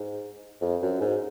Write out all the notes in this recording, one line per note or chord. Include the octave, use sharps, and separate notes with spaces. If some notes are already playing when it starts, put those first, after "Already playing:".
Already playing: G#2
F2
F#2
G#2